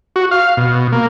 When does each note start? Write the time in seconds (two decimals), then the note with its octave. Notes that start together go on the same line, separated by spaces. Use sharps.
0.16 F#4
0.31 F5
0.57 B2
0.92 A#3